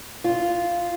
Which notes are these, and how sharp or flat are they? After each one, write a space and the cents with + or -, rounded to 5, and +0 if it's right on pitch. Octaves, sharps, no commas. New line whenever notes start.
F4 -5